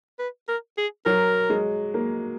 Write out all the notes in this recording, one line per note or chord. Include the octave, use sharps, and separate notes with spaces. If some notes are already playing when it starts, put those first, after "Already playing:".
B4
A#4
G#4
F#3 A#4
G#3
A#3